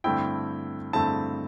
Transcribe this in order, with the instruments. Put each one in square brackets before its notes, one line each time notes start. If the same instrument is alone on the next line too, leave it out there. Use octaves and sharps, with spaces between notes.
[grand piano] G2 D3 A3 C4 E4 G5
G2 D3 A3 C4 E4 A5